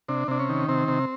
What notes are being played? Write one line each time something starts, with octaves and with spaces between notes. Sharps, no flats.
C3 D4
C3 D4
C#4
D#3
C3 C4
C3